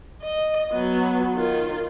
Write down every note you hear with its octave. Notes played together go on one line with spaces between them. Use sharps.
D#5
F#3 B3
D#3 F4